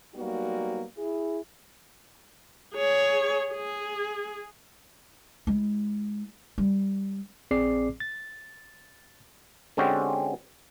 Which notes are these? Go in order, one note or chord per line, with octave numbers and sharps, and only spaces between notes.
F#3 G3 A#3 B3 D#4 F#4
E4 G#4
G#4 C#5
G#4
G#3 E4
G3
A#1 C4 G#4 D5 D6 C7
A6
D3 G#3 C4 C#4 F#4 G4